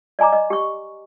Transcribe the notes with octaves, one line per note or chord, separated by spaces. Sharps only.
D5 D#5 G#5 A#5 D6
D#5
G4 C#6